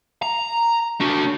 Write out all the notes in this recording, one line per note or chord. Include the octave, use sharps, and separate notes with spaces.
A#5
D4 F#4